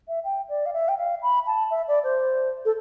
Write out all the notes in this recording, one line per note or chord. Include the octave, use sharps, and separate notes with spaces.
E5
G5
D5
F5
E5
G5
F5
B5
A5
E5
D5
C5
A4